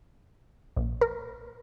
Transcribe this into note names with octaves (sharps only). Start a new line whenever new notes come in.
A#1
A#4